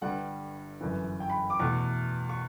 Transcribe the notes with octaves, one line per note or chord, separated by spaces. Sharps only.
G1 G2 D3 G3 F#5
G1 F#2 E3
G5
B5
D6
E2 B2 A3 C#6
C#6